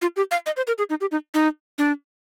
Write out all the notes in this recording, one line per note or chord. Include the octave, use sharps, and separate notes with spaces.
F4
G4
F5
D#5
C5
A#4
G#4
D#4
G4
D#4
D#4
D4